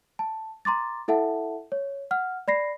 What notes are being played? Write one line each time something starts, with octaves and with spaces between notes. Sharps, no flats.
A5
A#5 C6 D6 A6
E4 A4 E5 F#5 A5
C#5
F#5 F6
D5 B5 A#6 C7